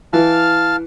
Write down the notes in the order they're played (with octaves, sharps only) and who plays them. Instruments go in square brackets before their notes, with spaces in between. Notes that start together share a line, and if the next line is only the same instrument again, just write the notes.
[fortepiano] E3 [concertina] F5 A5 F6